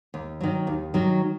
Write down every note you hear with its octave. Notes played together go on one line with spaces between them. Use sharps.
D#2
D#3 F#3
D#2
D#3 F#3